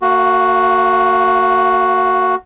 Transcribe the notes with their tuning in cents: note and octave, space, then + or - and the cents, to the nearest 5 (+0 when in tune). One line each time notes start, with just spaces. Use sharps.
A#3 -35 F#4 +0 F5 +0